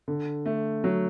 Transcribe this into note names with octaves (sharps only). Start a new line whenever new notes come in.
D3
A3
F#3